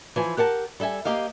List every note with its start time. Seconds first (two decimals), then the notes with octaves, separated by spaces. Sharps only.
0.16 E3 F3 G#5
0.37 G4 A#4 F#5 A5
0.80 G3 A4 E5 G#5
1.05 A#3 G4 D#5 F5